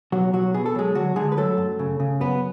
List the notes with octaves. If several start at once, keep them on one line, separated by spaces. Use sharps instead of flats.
B1 F#3 F#4
B1 F#3 F#4
B2 G#4
A4
F#3 G#3 G#4
D3 F#3 F#4
D3 G#3 G#4
B4
F#3 A3 A4
F#2
C#3
C#3
F#2 B3 B4